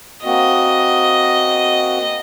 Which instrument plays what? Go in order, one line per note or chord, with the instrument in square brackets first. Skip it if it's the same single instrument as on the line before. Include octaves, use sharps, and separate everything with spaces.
[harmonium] A#3 C4 F#4 [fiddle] D#5